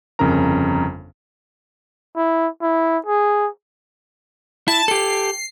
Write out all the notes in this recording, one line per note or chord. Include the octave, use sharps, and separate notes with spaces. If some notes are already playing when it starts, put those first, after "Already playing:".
G1 F2 C#3 C#4 A#4 A#5
E4
E4
G#4
E4 A5
G4 A4 C7